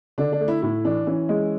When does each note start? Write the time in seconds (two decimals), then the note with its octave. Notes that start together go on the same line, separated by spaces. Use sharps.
0.18 D3 D4
0.32 D4
0.40 A3
0.48 E4
0.62 A2 E4
0.85 E3 D4
1.07 E3 C#4
1.29 G#3